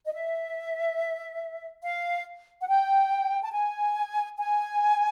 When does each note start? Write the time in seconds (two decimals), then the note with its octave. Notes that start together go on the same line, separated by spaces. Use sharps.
0.05 D#5
0.13 E5
1.82 F5
2.60 F#5
2.67 G5
3.42 A5
3.52 G#5
4.37 G#5